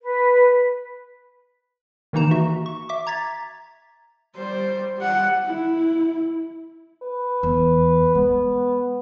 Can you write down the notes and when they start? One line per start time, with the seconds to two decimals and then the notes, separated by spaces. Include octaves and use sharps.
0.02 B4
2.13 D#3 E3 A#3 D#4 A#5 E7
2.31 F#4 E5
2.66 C#6
2.89 E5 D6
3.07 A#5 G#6 A6 B6
4.36 G3 C5
4.97 G3 F#5
5.46 E4
7.03 B4
7.43 E2
8.15 G#3 B3